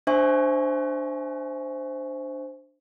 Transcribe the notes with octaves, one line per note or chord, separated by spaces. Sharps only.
D4 C5 E5 G#5 C#6